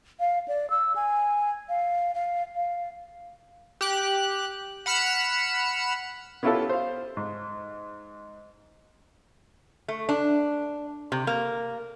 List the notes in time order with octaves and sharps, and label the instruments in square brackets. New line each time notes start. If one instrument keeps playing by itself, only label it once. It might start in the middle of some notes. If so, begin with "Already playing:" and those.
[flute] F5
D5
E6
G#5
F5
F5
F5
[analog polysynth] G4 F#6
F#5 B5 F6 C#7 E7
[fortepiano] B3 C#4 E4 F4 G4 A4
C5 F5
G#2
[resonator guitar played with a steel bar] A3
D4
C3
A#3